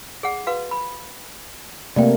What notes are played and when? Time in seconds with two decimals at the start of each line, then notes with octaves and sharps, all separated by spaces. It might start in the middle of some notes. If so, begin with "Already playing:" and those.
0.23 G#4 F#5
0.47 F#4 B4 F5
0.71 B5
1.96 C3 A3 A#3 D5 G5